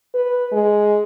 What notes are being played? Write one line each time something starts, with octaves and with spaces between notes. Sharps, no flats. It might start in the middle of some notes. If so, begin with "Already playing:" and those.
B4
G#3